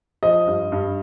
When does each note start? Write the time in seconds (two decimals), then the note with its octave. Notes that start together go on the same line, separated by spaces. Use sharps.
0.23 F3 D#5
0.47 G2
0.72 G2